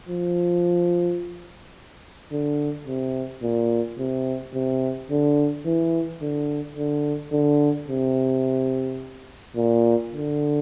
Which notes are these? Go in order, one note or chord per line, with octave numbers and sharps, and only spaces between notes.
F3
D3
C3
A#2
C3
C3
D3
E3
D3
D3
D3
C3
A#2
D3